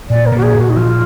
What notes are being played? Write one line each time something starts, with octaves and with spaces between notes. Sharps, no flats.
A#2 D5
A#4
A#2
F#4
G#4
A#2
F#4
D#4
F3 F4